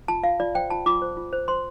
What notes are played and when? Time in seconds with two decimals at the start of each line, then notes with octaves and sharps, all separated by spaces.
0.08 F4 A5
0.24 F4 F5
0.40 F4 D5
0.55 C5 G5
0.70 F4 A5
0.86 F4 D6
1.02 C5
1.17 F4
1.33 C5
1.48 C5 C6